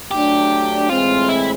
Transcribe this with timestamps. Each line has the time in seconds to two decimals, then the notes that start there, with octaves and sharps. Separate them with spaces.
0.11 F#3 A3 D4 G4
0.89 A2 E3 G#3 C4 F4
1.29 E4